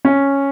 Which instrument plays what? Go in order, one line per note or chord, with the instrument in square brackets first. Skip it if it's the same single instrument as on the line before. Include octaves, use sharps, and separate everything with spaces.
[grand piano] C#4